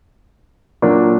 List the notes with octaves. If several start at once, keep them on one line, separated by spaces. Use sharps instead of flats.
A#2 F#3 A#3 D4